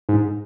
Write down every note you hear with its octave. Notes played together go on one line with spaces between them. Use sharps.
G#2